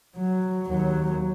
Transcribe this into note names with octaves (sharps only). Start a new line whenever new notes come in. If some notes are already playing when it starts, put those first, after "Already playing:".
F#3
D#2 F#3